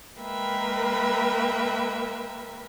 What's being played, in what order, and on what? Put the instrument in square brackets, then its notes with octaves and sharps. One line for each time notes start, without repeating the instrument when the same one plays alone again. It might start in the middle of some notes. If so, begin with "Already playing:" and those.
[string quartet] G#3 A#3 A#4 B4 E5 G5